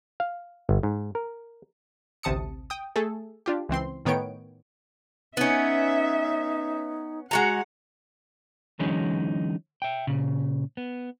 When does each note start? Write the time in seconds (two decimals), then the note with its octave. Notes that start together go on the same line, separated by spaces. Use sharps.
0.20 F5
0.69 G1
0.83 G#2
1.15 A#4
2.23 A1 D2 C3 A5 D#6 C#7
2.70 G5 D#6
2.96 A3 G#4 A4
3.46 D4 F4 G4
3.69 C#2 E3 C4 C6
4.05 A2 D#3 B3 C#5 G5 D7
5.37 B3 C#4 D#4 E5
7.31 G#3 F#4 F#5 A#5
8.79 D3 E3 F#3 G#3 C#4 D#4
9.82 E5 G5
10.07 A#2 C#3
10.77 B3